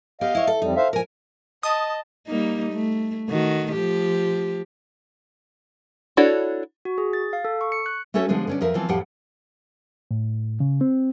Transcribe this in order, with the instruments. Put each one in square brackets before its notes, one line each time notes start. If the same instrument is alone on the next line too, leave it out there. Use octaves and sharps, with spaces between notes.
[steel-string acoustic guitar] B3 G4 [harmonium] D#5 F5
[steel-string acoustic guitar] E4 C#5
A4
[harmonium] F2 G3 [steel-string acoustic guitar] D#4
[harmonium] C5 E5 F5
[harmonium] A#2 F3 [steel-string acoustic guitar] A#4 G#5
[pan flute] D#5 [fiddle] A5 [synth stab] D#6
[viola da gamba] G3 A#3 D#4
A3
D#3 A3 F#4
F3 G4
[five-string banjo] D4 E4 F#4 A4 C#5
[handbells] F#4
G#4
A6
F5
A4
C#6
C#7
F#6
[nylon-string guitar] A3 C#4 F#4 A4 C#5 E5
D3 F3 G3 G#3 B3
D3 C#4 D5
F2 F3 A#4 E5
E3 F3 B3 C4
F2 A2 F3 G4 F#5 G5
[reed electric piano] A2
C#3
C4